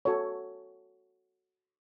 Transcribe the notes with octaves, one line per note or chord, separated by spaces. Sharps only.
F#4 A4 C#5